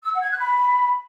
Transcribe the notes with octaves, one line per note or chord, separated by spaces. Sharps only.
E6
F#5
G#6
F#6
B5